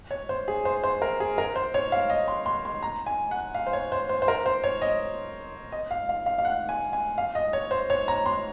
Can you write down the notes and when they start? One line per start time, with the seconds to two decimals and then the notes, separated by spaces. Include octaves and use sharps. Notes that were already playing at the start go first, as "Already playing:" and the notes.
0.11 C#5
0.29 C5
0.48 G#4
0.65 C5
0.84 C5
1.02 A#4
1.20 G#4
1.38 A#4
1.56 C5
1.74 C#5
1.92 F5
2.10 D#5
2.28 C6
2.46 C6
2.65 C6
2.83 A#5
3.06 G#5
3.31 F#5
3.54 F5
3.67 C5
3.73 C#5
3.92 C5
4.09 C5
4.22 C5
4.28 A#4
4.46 C5
4.64 C#5
4.82 D#5
5.72 D#5
5.91 F5
6.09 F5
6.26 F5
6.38 F5
6.45 F#5
6.69 G#5
6.93 G#5
7.18 F5
7.35 D#5
7.53 C#5
7.71 C5
7.90 C#5
8.08 A#5
8.26 C6